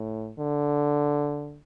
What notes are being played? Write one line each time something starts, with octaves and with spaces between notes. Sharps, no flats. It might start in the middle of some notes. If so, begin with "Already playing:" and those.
Already playing: A2
D3